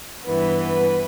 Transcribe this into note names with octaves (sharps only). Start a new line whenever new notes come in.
G2 E3 B3 B4